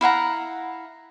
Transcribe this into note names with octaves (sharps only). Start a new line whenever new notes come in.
E4 F5 F#5 A#5